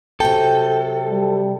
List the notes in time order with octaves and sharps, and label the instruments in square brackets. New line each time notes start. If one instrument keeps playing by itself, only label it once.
[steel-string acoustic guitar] C3 F#3 G5 [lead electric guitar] A4
[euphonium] G3